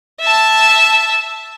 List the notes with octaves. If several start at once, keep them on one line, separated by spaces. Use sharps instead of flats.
E5 A5